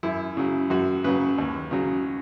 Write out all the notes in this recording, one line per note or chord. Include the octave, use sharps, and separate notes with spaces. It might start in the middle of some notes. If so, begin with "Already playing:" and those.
F#2 E4
C#3 F#3
F#2 F#4
C#3 F#3 B4
D#2
C#3 F#3